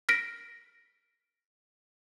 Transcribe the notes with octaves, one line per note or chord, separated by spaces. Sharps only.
F6 A#6 B6 D7